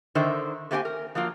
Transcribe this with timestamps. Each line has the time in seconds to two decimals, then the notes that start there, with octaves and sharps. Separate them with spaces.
0.15 D3 D#3 A#4 C5 E5
0.71 A3 A#3 C4 G4 G5 G#5
0.85 A#4
1.15 F3 F#3 A#3 F4